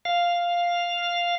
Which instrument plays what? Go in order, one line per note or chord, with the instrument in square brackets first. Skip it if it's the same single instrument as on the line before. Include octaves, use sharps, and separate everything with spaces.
[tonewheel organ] F5